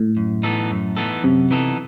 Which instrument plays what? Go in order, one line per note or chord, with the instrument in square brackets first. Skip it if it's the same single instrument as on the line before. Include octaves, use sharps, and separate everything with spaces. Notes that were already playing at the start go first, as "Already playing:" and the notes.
Already playing: [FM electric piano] A2
[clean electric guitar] F#2
E3 B3 D#4 A4
F#2
E3 B3 D#4 A4
[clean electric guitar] F#2 [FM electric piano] C3
[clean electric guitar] E3 B3 D#4 A4